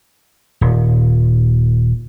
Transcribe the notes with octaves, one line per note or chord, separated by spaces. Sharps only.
D#1